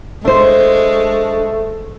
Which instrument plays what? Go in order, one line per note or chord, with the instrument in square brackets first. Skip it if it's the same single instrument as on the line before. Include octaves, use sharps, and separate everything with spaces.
[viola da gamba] G#3 [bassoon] A3 [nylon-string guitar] D4 C5